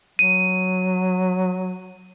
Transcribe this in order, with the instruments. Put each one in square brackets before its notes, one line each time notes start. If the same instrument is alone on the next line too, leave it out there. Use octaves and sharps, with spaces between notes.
[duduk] F#3 [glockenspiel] D#7